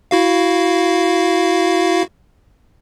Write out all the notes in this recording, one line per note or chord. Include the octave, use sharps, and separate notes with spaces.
E4 F#4 F5